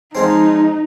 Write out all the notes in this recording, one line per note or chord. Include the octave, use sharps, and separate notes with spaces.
F3 G#3 C4 D#4